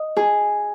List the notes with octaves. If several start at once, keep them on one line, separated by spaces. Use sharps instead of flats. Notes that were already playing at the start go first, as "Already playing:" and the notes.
Already playing: D#5
G#4